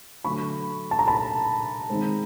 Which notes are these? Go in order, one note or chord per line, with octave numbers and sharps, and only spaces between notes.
D3 F#3 A3 B5 C#6
A5
A#5
A5 B5
D#3 G#3 C4